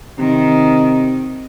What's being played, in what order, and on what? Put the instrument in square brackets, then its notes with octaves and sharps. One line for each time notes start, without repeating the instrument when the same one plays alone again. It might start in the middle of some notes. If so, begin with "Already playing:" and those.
[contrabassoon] C3 [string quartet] D#3